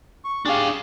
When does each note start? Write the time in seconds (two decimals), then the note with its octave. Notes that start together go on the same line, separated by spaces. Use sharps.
0.24 C#6
0.46 D4 G4 G#4 F5